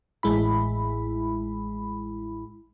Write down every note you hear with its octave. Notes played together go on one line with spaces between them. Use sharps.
A1 G#3 E4 B5